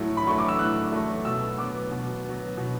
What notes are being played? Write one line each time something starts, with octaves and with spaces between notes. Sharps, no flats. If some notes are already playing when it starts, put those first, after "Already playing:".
Already playing: A2 F#3 A3
B5
F#3 A3 C#6
D6
E6
A2 F#6
F#3 A3
B2 E6
F#3 B3 D6
B2
F#3 B3
B2